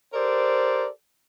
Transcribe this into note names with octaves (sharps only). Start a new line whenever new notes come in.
G4 A4 A#4 C5 D5